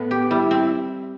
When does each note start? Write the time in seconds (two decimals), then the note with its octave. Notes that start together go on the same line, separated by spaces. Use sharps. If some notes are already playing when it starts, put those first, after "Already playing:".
Already playing: A2 B3
0.11 G4
0.31 G3 E4
0.51 C4